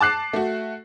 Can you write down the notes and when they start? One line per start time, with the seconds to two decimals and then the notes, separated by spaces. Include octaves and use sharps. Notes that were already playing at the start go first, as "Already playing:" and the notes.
0.01 A5 D6 F#6 C7
0.33 A3 F#4